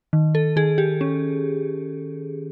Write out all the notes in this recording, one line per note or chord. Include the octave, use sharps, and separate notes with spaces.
D#3
A4
D#3 G#4
G4
C#4